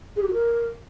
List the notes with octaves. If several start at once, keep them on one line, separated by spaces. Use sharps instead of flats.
G#4
G4
F#4
A#4